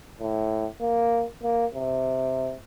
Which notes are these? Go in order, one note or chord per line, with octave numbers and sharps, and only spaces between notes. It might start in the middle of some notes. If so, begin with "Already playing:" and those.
A2
A#3
A#3
C3